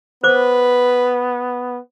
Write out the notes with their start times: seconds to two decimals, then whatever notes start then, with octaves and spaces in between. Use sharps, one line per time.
0.24 B3 B4 C5 D6